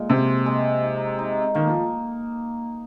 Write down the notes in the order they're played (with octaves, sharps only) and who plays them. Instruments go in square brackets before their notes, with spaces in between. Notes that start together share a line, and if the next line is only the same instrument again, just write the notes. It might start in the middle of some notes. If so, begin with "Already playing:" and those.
Already playing: [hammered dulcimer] A#2 G#3
[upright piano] C3 [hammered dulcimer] C5
[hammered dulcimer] G#3
D#4
D#4
[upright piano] D#3 [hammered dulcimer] A#3
[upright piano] F3